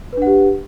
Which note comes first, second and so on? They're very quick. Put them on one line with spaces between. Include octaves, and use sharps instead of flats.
B4 D4 F#5 G4